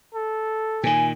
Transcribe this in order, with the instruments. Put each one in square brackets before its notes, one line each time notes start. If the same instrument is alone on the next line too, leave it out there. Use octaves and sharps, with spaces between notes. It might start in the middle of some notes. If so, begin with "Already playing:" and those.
[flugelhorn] A4
[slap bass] A#2 D#3 [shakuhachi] G#5